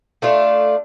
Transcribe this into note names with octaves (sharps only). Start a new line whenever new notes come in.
A3 D4 F4